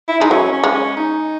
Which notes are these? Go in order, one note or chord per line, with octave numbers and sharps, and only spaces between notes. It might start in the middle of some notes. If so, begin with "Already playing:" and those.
E4
G#3 D#4
F#3 C#4
C#4
G#3
C#4
D#4